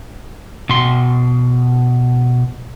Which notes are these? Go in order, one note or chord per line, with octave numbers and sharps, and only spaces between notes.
B2 C6